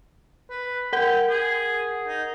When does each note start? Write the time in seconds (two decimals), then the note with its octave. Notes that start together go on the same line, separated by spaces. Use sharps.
0.50 B4
0.93 A#4 F#5 G5
1.29 G#4
2.07 D#4